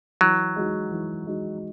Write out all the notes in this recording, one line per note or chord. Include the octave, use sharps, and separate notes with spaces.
E3 F#3
G#3 D#4 F#4
E3
G#3 D#4 F#4